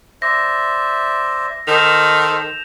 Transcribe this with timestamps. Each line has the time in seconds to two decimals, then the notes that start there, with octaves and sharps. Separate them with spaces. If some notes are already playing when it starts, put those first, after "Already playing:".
0.22 C5 D5 E5 A#6
1.67 D#3 A4 C5 G6 E7 F7